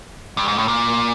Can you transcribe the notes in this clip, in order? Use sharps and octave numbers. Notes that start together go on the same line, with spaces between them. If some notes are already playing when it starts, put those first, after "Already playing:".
G2
G#2
A2
A#2